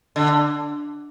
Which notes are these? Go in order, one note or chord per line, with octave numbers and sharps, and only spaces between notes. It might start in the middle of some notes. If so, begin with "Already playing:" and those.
D3